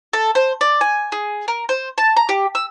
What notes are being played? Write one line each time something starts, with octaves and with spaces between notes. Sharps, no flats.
A4
C5
D5
G#5
G#4
A#4
C5
A5
A#5
G4
E6